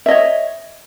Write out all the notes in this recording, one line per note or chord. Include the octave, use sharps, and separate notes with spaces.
C#5 D#5 E5